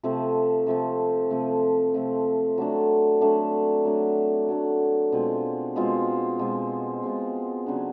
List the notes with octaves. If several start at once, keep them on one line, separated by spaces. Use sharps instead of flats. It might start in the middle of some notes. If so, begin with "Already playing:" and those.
C3 F3 A3 C4
C3 F3 A3 C4
C3 F3 A3 C4
C3 F3 A3 C4
F#3 A3 D4
F#3 A3 D4
F#3 A3 D4
F#3 A3 D4
B2 G#3 C4 F4
B2 G#3 C4 F4
B2 G#3 C4 F4
B2 G#3 C4 F4
C#3 F#3 B3 D4